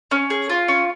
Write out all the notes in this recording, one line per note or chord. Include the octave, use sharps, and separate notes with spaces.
C#4
G#4
F4
C#4